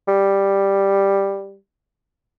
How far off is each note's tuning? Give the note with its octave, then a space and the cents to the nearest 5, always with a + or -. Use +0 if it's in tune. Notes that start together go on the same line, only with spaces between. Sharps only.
G3 +5